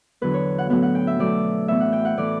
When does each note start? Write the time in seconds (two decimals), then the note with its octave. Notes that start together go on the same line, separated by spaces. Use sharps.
0.21 E2 D3 F#3 B3 B4
0.34 C#5
0.58 F#5
0.70 A2 F#3 B3 F#5
0.83 F#5
0.95 G5
1.07 E5
1.19 B2 F#3 A3 D5
1.68 A2 E3 B3 E5
1.80 F#5
1.93 G5
2.05 F#5
2.17 A2 E3 A3 D5